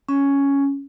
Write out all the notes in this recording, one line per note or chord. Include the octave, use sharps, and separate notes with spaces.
C#4